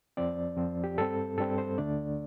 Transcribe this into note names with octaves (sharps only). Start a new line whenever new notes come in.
F2 F3 C4 D5
F2 F3 C4
G4
G2 G3 C4 A4
G2 G3 C4 A4
C5
D2 D3 A3 D4 D5